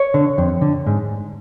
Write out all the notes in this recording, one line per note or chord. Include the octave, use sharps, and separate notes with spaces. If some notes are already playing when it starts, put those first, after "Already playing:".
Already playing: C#5
D3
F2
D3
G#2